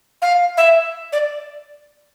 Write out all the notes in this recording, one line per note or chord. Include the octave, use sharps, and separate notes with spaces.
F5
E5
D5